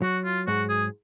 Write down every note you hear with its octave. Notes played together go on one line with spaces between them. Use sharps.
F#3 F#4
F4
G#2 F#4
G#4